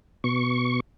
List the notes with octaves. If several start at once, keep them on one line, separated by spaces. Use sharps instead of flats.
B2 C#6